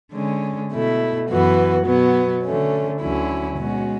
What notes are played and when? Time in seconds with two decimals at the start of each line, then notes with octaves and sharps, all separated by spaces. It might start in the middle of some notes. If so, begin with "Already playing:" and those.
0.13 D3 G#3 C#4
0.72 B2 A3 E4
1.29 F#2 E3 B3 F#4
1.86 B2 F#3 B3
2.44 D3 A3 C#4
3.00 D2 D3 F#3 C#4 E4
3.58 B2 G#3 C#4 F#4